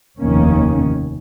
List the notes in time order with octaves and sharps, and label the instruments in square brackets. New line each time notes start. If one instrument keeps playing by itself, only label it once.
[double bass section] F1 D#2 D#3 A#3 C#4